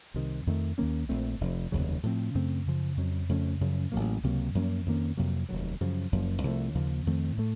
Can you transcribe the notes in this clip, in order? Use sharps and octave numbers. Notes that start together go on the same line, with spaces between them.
C2 C3 D#3
F2 D#3 A3
D#2 D#3 A#3 C#4
A#1 A#2 A3 C4
F1 F2 C3
F1 D#2 C#3 F#3
A2 F3 C4
F#2 C#3 A3 C4
F#2 C#3 F3
F2 C#3 F#3
F2 C#3 A3 C#4
F#2 C#3 F3
A1 A2 F#3 A#3
C#2 C3 F#3 A#3
F#2 F3 A#3 C#4
F2 D#3 A#3 C#4
F2 C3 F#3 A#3
F1 D#2 D#3 F#3
F#2 C#3 F3
F#1 F#2 F3 A#3
C2 A#2 F3 A3
D#2 C#3 F3 A#3
F2 D#3 A3 C4
A2 A3